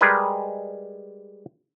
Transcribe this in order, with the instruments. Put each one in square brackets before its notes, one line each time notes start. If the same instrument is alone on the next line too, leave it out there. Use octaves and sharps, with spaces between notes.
[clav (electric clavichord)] G3 G#3 G#4 A#4 B4 D#5